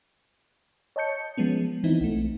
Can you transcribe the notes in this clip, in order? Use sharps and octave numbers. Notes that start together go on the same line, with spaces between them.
C#5 D#5 A5 G6 C#7
F3 G#3 B3 C#4
E3 B3 C4 D#4 E4
B1 A3